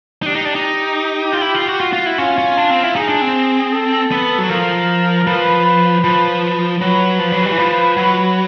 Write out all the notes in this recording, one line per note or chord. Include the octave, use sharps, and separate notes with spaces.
D#4
D4 G4
D#4
D4
D#4
F4
E4
F4
F#4
F4 F#4
F4
E4
C#4 F4
C#4
D4
C4
E4
D#4 G#4
D4
C4
A4
B3
F#3
F3 A#4
F3 B4
B4
F3 B4
F#3 B4
F3
F#3
G3
E3
F3
F#3